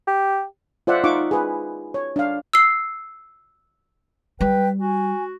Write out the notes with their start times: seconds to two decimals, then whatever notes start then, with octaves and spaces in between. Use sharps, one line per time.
0.08 G4
0.87 F4 C5 D5 E5 F#5
1.04 D#4 F4 F#5 C#6 D6
1.31 G#4 B4
1.94 C#5
2.16 D4 F5
2.53 E6 C7
4.41 G3 B4 G5
4.80 F#4 G#5